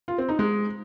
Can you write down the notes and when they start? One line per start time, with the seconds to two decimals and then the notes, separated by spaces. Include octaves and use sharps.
0.08 F4
0.18 C4
0.29 D#4
0.39 G#3